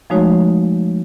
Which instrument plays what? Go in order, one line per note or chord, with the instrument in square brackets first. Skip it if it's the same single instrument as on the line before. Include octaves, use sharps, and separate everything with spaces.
[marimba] F3 G#3 A3 D#4 F#4 C#5